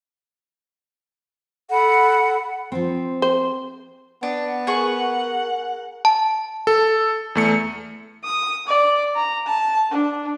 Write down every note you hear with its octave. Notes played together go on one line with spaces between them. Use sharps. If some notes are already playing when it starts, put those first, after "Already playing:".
A4 F#5 B5
F3 C4
C5
B3 D4
G#4 A#4 F#5 C#6
A5
A4
E2 A3 C#7
D#6
D5
A#5
A5
D4